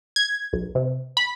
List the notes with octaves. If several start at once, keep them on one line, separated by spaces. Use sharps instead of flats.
G#6
B1
C3
B5